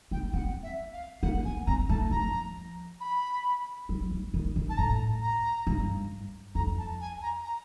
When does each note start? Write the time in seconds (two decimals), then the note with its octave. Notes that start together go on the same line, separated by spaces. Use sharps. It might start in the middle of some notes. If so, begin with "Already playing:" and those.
0.11 B3 G5
0.33 C4 F#5
0.63 E5
0.93 F5
1.22 A#3 F#5
1.45 B3 G#5
1.67 C4 A#5
1.89 A3 A5
2.11 F3 A#5
3.00 B5
3.89 F#3
4.11 F#3
4.34 D#3
4.56 D#3
4.69 A5
4.78 A2 A#5
5.22 A#5
5.67 G2
6.55 F2 A#5
6.78 A5
7.01 G#5
7.22 A#5
7.44 A#5